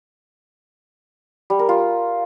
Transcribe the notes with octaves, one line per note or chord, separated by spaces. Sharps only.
G3
A#4
F4